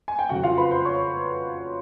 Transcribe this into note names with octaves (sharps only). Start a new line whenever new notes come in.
G#5
G5
F2 C#3 F#3 F#4 F#5
F4 F5
B4 B5
C5 C6
C#5 C#6